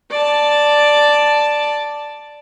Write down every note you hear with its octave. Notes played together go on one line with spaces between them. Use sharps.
D5 A5